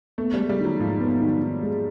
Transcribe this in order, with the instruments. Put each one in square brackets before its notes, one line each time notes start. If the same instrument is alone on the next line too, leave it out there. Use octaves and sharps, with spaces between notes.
[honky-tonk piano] A3 [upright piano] B3
[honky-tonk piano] G3
[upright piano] G#3
[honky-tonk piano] G3
[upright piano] D#3 [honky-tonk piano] F#3
[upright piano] G#2 [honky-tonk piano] F3
[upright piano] B3
D#3
D#3
G#3